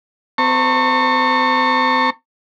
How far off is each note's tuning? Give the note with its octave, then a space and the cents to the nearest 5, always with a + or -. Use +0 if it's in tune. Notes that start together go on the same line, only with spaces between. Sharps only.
C4 -35 A5 +45 C#6 -15